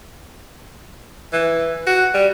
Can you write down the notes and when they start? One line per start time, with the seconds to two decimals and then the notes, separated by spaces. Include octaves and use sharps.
1.33 E3
1.86 F#4
2.14 G3